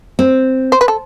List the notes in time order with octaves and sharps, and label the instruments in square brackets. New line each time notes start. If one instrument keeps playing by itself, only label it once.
[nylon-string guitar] C4
[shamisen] C5
B4
A4